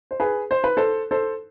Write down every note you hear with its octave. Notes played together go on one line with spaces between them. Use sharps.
C5
G#4 B4
C5
B4
A4 C5
A4 C5